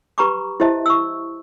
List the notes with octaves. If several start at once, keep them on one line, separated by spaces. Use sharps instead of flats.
G4 B4 A#5 B5 C#6 D6
E4 G4 C5 D#5 E5 A5
C#6 E6